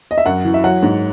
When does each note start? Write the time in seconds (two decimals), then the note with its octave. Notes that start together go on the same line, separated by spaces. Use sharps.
0.11 D#5
0.18 E5
0.26 F#2 F#5
0.45 E3
0.54 E5
0.64 F#3 F#5
0.83 G#2